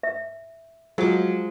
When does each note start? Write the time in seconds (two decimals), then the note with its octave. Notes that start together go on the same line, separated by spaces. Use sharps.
0.03 E5
0.98 F3 F#3 G#3 D6